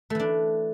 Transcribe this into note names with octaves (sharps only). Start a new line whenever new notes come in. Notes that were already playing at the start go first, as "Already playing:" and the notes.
E3 A3 D4